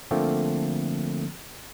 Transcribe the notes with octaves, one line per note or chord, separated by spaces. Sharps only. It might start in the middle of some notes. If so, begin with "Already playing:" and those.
D3 F3 A3 A#3 C4